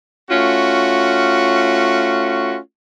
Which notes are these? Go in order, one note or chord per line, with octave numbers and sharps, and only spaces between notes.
A3 C#4 F4 F#4